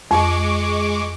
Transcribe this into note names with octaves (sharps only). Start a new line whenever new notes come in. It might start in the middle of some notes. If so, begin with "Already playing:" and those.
F2 G#3 C#6 D6